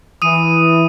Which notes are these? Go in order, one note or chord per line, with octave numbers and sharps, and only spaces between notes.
E3 D#6 D#7